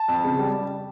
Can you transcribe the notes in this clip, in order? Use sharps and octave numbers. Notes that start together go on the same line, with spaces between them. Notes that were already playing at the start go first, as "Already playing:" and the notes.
Already playing: A5
F2
C#3
G3